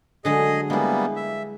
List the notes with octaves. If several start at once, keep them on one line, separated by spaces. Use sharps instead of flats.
D3 F#3 G#3 G#4 D#5
G3 G#3 A#3 B3 E4
E5